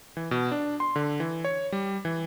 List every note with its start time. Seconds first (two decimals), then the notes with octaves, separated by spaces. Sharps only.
0.17 E3
0.31 B2
0.51 D4
0.80 C6
0.96 D3
1.20 E3
1.44 C#5
1.72 G3
2.05 E3